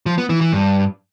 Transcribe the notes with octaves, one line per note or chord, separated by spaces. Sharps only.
F3
B3
E3
E3
G2